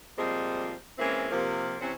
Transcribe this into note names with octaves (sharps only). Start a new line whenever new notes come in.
A#2 F3 G3 G#3 C4
E3 G#3 A#3 C4 C#4 E4
C3 F3 A#3
C3 E3 C4 C#4